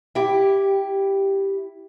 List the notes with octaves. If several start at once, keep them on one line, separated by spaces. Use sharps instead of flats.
E4 G4